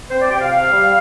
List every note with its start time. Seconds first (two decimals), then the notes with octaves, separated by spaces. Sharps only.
0.10 C4 C5
0.21 D5
0.31 C3 G5
0.41 F5
0.52 C3 F5
0.72 G3